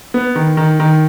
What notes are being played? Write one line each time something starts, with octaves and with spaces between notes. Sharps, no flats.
B3
D#3
D#3
D#3